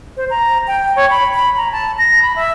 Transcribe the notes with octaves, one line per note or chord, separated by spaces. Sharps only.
C5
A#5
G5
C#5
B5
B5
A#5
A5
A#6
B5
E5